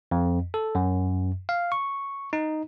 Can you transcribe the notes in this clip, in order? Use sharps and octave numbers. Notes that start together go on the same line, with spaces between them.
F2
A4
F#2
F5
C#6
D#4